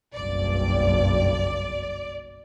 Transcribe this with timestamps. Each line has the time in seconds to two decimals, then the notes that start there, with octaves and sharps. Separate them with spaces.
0.14 F#1 B1 G2 D5